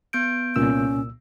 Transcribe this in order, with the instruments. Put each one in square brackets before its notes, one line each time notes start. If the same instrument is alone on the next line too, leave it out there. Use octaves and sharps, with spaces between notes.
[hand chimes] B3 G6 D7
[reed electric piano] C2 A#2 E6 [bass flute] C#4